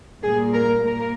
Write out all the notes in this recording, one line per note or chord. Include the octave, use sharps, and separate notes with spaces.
A#2 G3 A#3 G#4
A#4
A#3 A#4